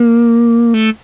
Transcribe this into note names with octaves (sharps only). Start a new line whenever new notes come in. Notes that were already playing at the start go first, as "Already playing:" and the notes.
Already playing: A#3
A3